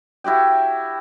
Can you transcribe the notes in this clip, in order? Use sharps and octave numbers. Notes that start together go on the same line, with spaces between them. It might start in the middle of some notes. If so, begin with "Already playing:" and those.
E4 F#4 G4 G5